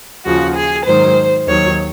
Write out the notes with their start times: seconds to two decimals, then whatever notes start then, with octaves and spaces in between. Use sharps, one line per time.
0.25 D#2 C#3 F3 F#4
0.55 G#4
0.85 G#2 D#3 F#3 C5
1.46 D#2 D#3 F#3 C#5